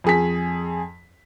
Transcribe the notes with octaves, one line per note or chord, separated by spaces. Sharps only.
F2 G#4 B6